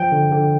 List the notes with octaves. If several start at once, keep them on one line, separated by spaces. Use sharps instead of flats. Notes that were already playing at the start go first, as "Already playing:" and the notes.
Already playing: F3 G5
D3
D3